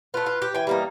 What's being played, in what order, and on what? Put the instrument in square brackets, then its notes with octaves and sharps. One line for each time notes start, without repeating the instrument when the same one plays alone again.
[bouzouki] A3 F4 [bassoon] B4
[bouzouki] F4
G4
[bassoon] E3 [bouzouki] G5 G#5
[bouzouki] G3 A#3 D#4